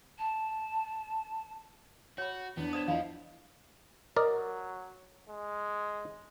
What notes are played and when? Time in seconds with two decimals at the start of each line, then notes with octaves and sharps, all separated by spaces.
0.18 A5
2.18 F#4 C#5 B5
2.57 E2 B3 D4
2.73 C5 D5 D#6 G#6 E7
2.88 E2 F3 E4 D#5 F5
4.16 F#3 A#4 D5 D#5
5.29 G#3